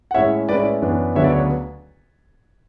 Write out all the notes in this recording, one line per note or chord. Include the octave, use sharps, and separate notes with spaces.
F#5
A2 G#3 C#4 E4 C#5 E5
A2 G#3 C#4 E4 B4 D5
B4 D5
F#2 E3 B3 D4
D2 C#3 F#3 B3 D4 C#5 E5
B4 D5
C#5
B4